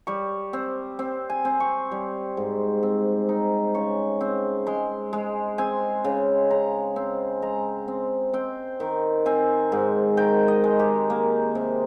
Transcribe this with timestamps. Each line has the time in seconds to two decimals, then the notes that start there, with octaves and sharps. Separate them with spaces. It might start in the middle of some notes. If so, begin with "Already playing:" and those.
0.07 G3 C#6
0.53 C4
0.99 C4
1.30 G#5
1.45 C4
1.60 C#6
1.92 G3
2.37 G#2
2.83 C4
3.29 D#4
3.74 C#3 C#6
4.21 C4
4.67 G#3 C6
5.13 G#3
5.58 C4 G#5
6.04 C#3
6.50 C#3 A#5
6.96 C4
7.42 G#3 A#5
7.88 C4
8.33 C4 G5
8.80 D#3
9.26 C4 G#5
9.72 G#2
10.17 D#3 G5
10.48 D#5
10.64 G#3
10.79 G4
11.10 A#3
11.55 C3